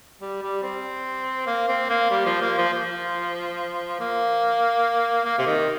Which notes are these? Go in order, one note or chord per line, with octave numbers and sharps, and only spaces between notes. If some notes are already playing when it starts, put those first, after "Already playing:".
G3
G3
C4
A#3
C4
A#3
G3
F3
A#3
F3
F3
A#3
A#3
C3
D#3